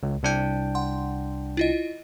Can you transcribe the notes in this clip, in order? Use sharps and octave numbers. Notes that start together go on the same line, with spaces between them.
C#2
C2 D4 G5
F#5 C6
E4 F4 D#5